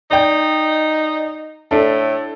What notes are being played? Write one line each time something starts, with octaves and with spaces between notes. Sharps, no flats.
D#4 D5 G5
A2 D4 A4